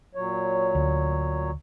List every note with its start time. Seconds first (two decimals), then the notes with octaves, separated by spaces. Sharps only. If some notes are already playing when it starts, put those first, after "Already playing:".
0.15 A#2 F#3 C#5
0.75 D2